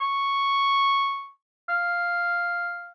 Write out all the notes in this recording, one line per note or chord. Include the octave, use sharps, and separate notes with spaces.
C#6
F5